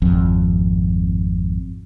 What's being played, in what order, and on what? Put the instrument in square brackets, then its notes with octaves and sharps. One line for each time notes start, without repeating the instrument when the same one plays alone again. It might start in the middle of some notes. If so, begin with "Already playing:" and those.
[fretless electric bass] G#1 F2